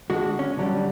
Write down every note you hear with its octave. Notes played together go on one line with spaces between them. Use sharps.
D3 G#3 F#4
C#4
D3 F#3 G3